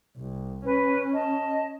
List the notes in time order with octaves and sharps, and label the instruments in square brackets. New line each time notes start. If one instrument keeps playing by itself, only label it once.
[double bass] C2
[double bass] C#4 [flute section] B4
[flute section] D#5 A5